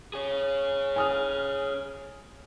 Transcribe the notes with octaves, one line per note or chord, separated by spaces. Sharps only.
G#4 C#5
G#5 D#6 F6